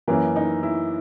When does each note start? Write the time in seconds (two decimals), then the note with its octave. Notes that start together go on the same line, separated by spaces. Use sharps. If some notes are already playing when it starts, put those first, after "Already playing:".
0.08 F#2 E3 A#3
0.36 D#4
0.63 E4